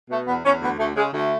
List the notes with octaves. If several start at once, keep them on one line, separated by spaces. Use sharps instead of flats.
B2 A3
E2 B3
E2 C#4
D2 B3
D2 A3
C#3 G#3
D2 A3